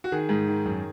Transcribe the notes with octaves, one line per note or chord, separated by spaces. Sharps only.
F#4
D#3 G#4
G#2
D#3
F#2